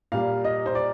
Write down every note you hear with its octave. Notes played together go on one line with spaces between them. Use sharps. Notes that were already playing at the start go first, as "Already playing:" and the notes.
A#2 G3 F5
D#5
C5
D5